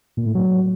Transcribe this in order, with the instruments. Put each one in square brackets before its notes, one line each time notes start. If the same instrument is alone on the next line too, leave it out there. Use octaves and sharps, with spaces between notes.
[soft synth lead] A#2
A2
F#3